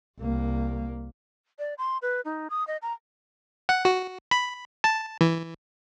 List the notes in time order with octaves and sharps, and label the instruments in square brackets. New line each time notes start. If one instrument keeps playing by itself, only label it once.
[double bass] C2 A#3
[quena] D5
C6
B4
D#4
D#6
D#5
A#5
[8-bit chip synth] F#5
F#4
B5
A5
E3